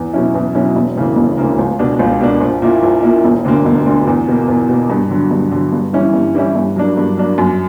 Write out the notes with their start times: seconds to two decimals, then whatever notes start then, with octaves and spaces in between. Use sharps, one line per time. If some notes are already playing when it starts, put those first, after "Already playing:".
Already playing: E2
0.13 B2 F#3 C#4 E4
0.34 E2
0.55 B2 F#3 C#4 E4
0.75 E1
0.96 D2 C#3 E3 A#3
1.16 E1
1.37 D2 C#3 E3 A#3
1.59 C#2
1.79 B2 A#3 D4
1.99 C#2
2.21 B2 A#3 D4
2.41 A#1
2.62 A#2 A#3 E4
2.83 A#1
3.03 A#2 A#3 E4
3.24 E1
3.45 D2 D3 A#3
3.65 E1
3.86 D2 D3 A#3
4.07 E2
4.28 B2 A#3
4.48 E2
4.69 B2 A#3
4.90 G2
5.10 D3 F#3
5.31 G2
5.52 D3 F#3
5.72 G2
5.93 E3 G3 C#4 E4
6.14 G2
6.35 E3 G3 C#4 E4
6.55 G2
6.76 F#3 A#3 D4
6.97 G2
7.17 F#3 A#3 D4
7.38 F#2